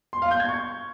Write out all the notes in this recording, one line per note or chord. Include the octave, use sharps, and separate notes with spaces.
C6
F5
G6
G#6
C#6